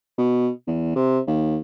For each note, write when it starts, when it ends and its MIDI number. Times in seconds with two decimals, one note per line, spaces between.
0.18 0.50 47
0.67 0.92 40
0.96 1.19 48
1.27 1.58 39